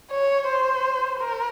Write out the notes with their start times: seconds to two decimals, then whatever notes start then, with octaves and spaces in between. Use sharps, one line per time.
0.11 C#5
0.48 C5
1.20 A#4